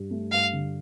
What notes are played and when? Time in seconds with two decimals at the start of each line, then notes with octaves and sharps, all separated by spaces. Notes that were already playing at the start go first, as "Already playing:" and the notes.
Already playing: G2
0.11 A3
0.32 G2 F5
0.53 D3